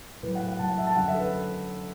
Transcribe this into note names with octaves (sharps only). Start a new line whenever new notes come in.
A2 F#3 B4
F#5
F#5
A2 F#3 A5
F#5
E5
A5
F#2 D3 F#3 F#5
E5
A4
B4